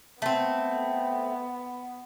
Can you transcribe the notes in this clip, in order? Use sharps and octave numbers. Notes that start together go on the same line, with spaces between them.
A3 B3 C4